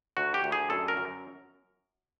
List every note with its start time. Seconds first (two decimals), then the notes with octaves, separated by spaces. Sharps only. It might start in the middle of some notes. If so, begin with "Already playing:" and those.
0.17 D2 F#4
0.34 G4
0.44 D2
0.52 G#4
0.70 F#2 A4
0.88 A#4
0.97 F#2